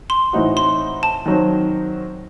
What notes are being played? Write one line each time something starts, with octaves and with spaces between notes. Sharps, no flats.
C6
A2 E3 C4 D#4 F#4
C6
A5
D#3 F#3 C4